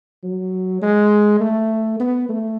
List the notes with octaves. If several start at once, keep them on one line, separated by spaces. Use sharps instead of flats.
F#3
G#3
A3
B3
A3